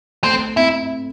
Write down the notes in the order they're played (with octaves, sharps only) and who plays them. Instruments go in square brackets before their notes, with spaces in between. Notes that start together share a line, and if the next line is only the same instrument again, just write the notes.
[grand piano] A3 [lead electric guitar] C4
[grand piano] C4 [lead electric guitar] E4